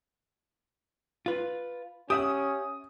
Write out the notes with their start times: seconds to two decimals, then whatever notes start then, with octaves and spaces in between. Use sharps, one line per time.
1.26 F4 B4
2.10 C#4 G4 E5 F#5 D#6